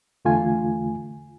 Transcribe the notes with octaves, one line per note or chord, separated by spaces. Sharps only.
E2 D3 A3 F4 G#5